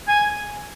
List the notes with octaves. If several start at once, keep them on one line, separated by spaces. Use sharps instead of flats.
G#5